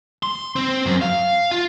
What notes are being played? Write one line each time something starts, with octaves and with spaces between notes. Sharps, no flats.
C6
C4
F#2
F5
F4